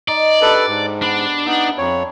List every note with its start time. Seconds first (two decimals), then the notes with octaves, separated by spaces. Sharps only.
0.08 D#4 D5
0.42 D4 G4 A4 B4
0.68 G#2
1.02 B3 D4
1.46 B3 D#4 E5
1.78 F2 C4 C#5 A#5